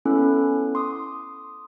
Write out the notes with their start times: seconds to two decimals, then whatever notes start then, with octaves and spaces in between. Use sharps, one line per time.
0.05 B3 C#4 E4 A4 F#6
0.75 C6 D6 D#6